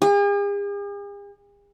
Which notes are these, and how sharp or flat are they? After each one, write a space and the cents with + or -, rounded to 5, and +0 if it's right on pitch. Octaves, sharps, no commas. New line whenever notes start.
G#4 -45